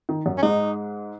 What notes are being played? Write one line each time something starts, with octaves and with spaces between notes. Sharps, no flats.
D#3
F#2 F#3
C#4
G#2 G#3 D#4